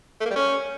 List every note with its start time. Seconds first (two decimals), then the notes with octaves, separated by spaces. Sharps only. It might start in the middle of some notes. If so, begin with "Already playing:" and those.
0.21 A3
0.26 A#3
0.31 G3
0.36 C#4